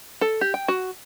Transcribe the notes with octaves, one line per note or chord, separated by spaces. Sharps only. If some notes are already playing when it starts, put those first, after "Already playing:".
A4
G4
G5
F#4